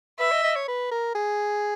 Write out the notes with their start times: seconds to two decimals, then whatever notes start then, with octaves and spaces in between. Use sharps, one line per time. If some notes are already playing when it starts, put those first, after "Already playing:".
0.19 B4 E5
0.32 D#5
0.43 D#5
0.56 C#5
0.68 B4
0.91 A#4
1.15 G#4